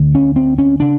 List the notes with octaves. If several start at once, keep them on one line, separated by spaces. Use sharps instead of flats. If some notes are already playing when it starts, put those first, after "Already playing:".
Already playing: D2 D3
C#4
C4
C#4
C#3 D4